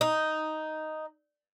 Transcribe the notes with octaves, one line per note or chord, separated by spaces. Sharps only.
D#4